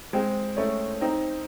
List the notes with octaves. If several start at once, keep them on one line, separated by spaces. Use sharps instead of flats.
G#3 C4
A3 C#4
C4 D#4